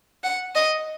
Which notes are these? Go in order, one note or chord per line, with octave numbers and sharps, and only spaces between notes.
F#5
D#5